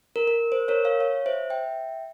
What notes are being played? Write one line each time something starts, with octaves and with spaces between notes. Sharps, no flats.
A#4
A#4
C5
A#4 C#5
C#5 F5
C#5 F5
C5 E5
E5 G5